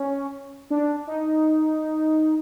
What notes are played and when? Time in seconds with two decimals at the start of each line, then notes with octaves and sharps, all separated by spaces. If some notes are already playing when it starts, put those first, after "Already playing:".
Already playing: C#4
0.70 D4
1.07 D#4